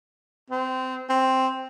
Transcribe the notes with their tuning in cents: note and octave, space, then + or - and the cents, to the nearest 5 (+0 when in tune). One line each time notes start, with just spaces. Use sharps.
C4 -20
C4 +0